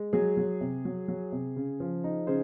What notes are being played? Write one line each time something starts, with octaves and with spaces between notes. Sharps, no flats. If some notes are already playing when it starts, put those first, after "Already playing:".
Already playing: G#3
F#3 G#4
F#3
C3
F#3
F#3
C3
C#3
F3
D#4
C#3 G#4 C5